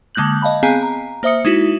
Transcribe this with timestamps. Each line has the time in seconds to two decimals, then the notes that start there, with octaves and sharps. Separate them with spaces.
0.15 D3 G#3 A#3 F#6 G6 F#7
0.42 D#5 F5 A5 B5
0.63 B3 C4 G#4 F5 G#5 A#5
0.83 A#5
1.23 A#3 C5 E5 D#6 C#7
1.45 G#3 D#4 E4 F#4